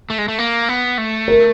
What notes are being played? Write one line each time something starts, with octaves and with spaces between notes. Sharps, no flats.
A3
G#3
A3
A#3
B3
A3
A#4